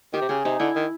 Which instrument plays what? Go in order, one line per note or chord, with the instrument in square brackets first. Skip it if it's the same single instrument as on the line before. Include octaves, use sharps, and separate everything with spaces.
[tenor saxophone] D#3 [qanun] G4
[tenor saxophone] C3
[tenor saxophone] C#3 [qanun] G#4
[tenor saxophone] C3 [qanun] D#4
[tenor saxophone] D3 [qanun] E4
[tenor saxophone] D#3